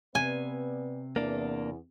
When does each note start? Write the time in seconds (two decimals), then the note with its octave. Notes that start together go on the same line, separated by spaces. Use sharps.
0.15 C3 B3 B4 D5 G#5
1.16 E2 A#3 D4